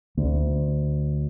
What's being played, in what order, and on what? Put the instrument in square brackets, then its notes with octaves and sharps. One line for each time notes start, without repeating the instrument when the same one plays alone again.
[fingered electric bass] D2